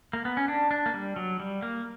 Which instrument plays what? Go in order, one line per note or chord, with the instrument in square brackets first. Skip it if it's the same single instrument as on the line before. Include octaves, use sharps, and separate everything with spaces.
[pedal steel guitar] A#3
B3
C#4
D4
D4
A#3
G3
F#3
G3
A#3